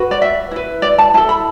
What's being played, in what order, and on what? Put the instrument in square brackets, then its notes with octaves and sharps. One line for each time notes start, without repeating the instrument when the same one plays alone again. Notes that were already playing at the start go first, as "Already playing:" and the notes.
Already playing: [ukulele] F#4 B4
D5
E5
E4 B4
D5
A5
E4 A5
A4
B5